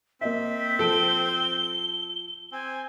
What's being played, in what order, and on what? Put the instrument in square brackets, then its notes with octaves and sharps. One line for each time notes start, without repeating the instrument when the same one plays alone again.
[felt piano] A#3 D#5 E5 [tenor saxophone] C4 [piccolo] B6
[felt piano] F3 D7 [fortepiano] A4 [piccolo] G7
[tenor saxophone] C4 [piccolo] G#5